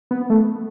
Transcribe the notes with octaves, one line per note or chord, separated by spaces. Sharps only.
B3
A3